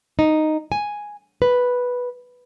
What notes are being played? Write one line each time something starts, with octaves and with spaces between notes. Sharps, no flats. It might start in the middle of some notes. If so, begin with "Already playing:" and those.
D#4
G#5
B4